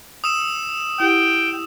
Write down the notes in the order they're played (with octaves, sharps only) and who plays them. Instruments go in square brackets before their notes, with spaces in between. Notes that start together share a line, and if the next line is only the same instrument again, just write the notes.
[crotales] D#6 E6 E7
[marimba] E4 G4 F#5 [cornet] G5